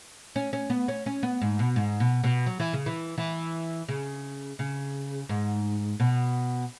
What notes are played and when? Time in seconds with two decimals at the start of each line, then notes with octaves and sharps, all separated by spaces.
0.36 C#4
0.53 C#4
0.70 B3
0.88 C#4
1.06 C#4
1.23 B3
1.42 G#2
1.59 B2
1.76 G#2
2.00 B2
2.24 B2
2.46 F#3
2.60 E3
2.73 C#3
2.86 E3
3.18 E3
3.88 C#3
4.59 C#3
5.29 G#2
6.00 B2